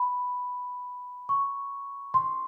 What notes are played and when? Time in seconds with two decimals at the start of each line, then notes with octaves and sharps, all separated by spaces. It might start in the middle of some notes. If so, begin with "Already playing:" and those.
Already playing: B5
1.29 C#6
2.14 C6